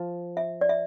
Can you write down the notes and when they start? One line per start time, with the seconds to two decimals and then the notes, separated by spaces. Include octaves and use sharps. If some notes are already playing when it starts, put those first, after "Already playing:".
Already playing: F3
0.37 E5
0.61 D5
0.69 E5